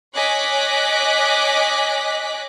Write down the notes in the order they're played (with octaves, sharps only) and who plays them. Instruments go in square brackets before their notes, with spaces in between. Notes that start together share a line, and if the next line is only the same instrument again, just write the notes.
[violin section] C#5 D#5 G#5 D6 F#6 B6